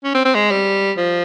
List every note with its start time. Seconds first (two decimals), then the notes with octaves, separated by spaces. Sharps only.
0.04 C#4
0.14 C4
0.25 C4
0.35 G#3
0.51 G3
0.97 F3